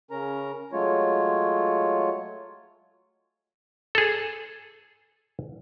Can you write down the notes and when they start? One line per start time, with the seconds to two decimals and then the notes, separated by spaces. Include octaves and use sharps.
0.11 C#3 C#4 A#4 A#5
0.73 F#3 G#3 A3 F4 C#5
3.95 G#4 A4